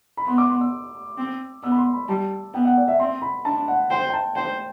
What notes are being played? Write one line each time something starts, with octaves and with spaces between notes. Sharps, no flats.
B5
B3 C6
D6
C6
E6
C4
B3 E6
B5
C6
B5
G3 A5
B3 G5
F#5
D5
E5
C4 C6
B5
D4 A5
F#5
C5 G5
G5
A5
C5 G5